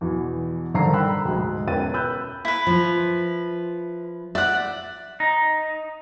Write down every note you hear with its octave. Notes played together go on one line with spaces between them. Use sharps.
E2 B2 E3
G2 D3 D#3 C5 A#5 C7
G5 A#5 B5 E6 F#6
D2 G#2
E1 C#4 B4 G5 A6 D#7
B5 E6 F#6 G6
E4 B4
F3
D5 E5 F#5
D#4